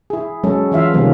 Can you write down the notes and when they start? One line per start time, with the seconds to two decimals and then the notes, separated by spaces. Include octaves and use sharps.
0.10 E4 G#4
0.44 F#3 G#3 C#4 A4
0.72 E3 F4 E5 F5
0.93 C3 D#3 F3 G3 A#3 C#4